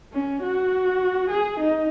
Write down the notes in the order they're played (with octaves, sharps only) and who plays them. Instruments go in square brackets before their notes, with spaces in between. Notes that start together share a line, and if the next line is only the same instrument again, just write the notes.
[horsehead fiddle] C#4
F#4
G#4
D#4